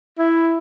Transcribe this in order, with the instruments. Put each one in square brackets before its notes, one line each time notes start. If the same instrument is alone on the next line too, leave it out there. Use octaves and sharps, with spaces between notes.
[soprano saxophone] E4